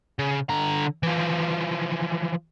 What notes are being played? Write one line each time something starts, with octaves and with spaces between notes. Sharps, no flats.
C#3
D3 A#5
E3 F3